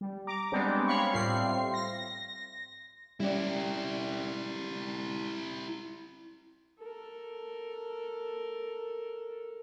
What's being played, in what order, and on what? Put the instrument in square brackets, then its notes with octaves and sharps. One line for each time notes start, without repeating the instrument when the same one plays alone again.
[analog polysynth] G3
A#5 D6
G3 G#3 B3 C4 D4 G4
C#5 F5 B5 C#6
A2 G3 C4 F4 C7
A#6
[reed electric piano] G3 C#4 D5 [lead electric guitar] E4 G4
[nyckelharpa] A4 A#4